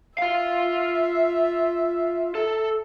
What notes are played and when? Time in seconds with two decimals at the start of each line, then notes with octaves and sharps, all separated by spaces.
0.18 F4 E5 F5
2.35 A4